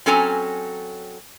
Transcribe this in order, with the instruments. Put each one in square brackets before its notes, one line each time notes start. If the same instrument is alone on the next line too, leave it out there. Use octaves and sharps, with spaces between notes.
[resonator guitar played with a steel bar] F#3 C4 C#4 A4 G#5 A#5